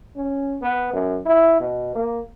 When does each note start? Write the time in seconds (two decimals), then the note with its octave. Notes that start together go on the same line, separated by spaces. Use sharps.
0.16 C#4
0.62 B3
0.93 F#2
1.26 E4
1.60 B2
1.95 A#3